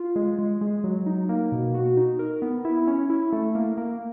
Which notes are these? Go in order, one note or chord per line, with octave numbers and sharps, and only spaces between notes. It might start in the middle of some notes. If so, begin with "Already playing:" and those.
Already playing: F4
G#3
G#3
G#3
F#3
D#4
A#3
B2
F#4
D#4
A#4
B3
E4
C#4
E4
A3
A#3
A#3